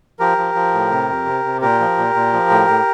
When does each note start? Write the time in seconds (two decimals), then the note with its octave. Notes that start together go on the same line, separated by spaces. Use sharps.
0.19 F3 G4 A#4
0.38 F3
0.55 F3
0.74 A2
0.91 C3
1.09 F2
1.26 C3
1.45 C3
1.61 A#2 G4 A#4
1.80 F3
1.97 A#2
2.15 A#2
2.33 F3
2.50 A2
2.68 A2